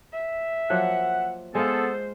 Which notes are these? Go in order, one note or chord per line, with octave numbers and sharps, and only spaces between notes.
E5
F3 F#3 A#3 F#5
G#3 B3 A4 C5 F5